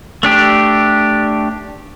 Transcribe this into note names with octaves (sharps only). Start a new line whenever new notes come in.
A3 D4 G4